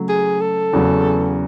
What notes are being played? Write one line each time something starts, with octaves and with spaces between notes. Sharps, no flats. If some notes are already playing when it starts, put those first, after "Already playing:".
Already playing: C#3 F#3 A3
G#4
A4
E2 C#3 F#3